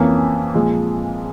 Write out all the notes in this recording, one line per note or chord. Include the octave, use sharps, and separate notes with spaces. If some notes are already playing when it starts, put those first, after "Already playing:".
Already playing: F2 E3 A#3 C#4
A#2 F3 G#3